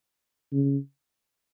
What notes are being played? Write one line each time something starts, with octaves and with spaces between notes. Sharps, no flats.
C#3